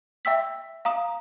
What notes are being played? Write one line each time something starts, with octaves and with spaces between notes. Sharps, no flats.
E5 G5 E6 B6
F5 A#5 D#6